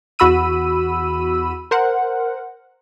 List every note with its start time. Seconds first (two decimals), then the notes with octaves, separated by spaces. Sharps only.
0.19 E2 F#4 B5 E6 D#7
1.71 A#4 C5 F#5